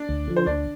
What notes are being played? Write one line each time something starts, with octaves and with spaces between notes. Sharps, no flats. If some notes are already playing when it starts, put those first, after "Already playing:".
Already playing: D4 D5
D2
D3 F3
C5
D2 D4 D5